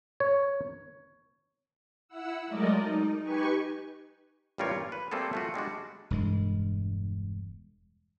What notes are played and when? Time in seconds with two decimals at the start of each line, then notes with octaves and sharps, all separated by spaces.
0.20 C#5
2.08 E4 F#5 E6
2.47 F#3 G#3 A3 A#4 D5 D#5
2.79 D#4
3.23 D#4 G4 B4 G#5 C#6
4.58 A1 G2 G3 F4 A#4 C#5
4.76 A#2
4.92 B4
5.11 G3 A3 A#3 C4 G#4 A4
5.33 A3 F4 F#4
5.54 G3 G#3 D4 F#4
6.11 E1 G2 G#3